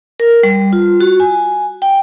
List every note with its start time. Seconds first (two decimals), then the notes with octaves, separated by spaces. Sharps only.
0.20 A#4
0.43 G3
0.73 F4
1.01 F#4
1.20 G#5
1.82 G5